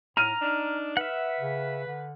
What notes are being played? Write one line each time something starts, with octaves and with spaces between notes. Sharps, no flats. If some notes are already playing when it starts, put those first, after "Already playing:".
A2 A#5 F6 D#7
D4 D#4
B4 E5 F#5
C#3
D3